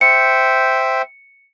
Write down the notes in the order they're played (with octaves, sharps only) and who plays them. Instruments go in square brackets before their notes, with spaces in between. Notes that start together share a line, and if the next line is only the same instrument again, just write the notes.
[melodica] C5 E5 G5 [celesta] C#7